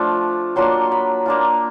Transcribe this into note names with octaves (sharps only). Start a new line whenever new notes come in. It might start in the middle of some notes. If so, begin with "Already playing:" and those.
Already playing: F3 A3 D4 F4
F#3 A#3 D4 F4 C6
B5
A#3 D4 F4